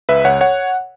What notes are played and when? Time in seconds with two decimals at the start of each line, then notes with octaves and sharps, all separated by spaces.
0.09 C#2 B4 E5
0.25 C#2 C#5 F#5
0.41 C#5 F#5